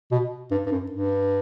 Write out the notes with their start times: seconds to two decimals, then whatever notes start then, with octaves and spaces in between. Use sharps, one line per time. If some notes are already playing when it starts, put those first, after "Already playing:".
0.11 B2
0.51 G2
0.66 G2
0.71 F#2
0.92 G2